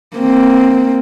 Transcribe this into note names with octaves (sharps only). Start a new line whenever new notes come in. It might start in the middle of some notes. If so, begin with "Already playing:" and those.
A#3 C4